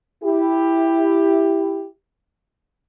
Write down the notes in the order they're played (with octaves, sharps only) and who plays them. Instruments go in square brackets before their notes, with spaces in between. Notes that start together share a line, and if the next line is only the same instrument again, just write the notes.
[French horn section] E4 G4